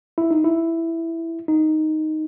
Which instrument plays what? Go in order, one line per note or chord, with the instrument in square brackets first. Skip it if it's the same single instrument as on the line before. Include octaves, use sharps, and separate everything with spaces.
[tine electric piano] E4
D#4
E4
D#4